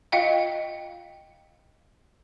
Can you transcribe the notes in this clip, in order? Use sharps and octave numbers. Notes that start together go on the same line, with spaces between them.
F4 D#5 F5 G5